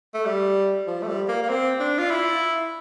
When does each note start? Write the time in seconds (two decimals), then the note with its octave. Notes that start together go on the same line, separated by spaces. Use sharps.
0.14 A3
0.26 G3
0.87 F3
1.02 A3
1.07 G3
1.28 A#3
1.43 A#3
1.49 C4
1.80 D4
1.98 F4
2.10 E4